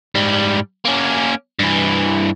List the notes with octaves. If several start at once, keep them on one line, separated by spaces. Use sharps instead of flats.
G#2 G3
A#3 C#4
G2 E3